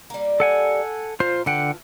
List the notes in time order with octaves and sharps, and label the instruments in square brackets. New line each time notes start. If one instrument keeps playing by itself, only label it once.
[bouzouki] G3 A#3
[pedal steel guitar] A4 F#5 G#5
[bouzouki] A#2 [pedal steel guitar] F4 C5
[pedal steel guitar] D3 F#5 G5 [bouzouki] E3 F4 A5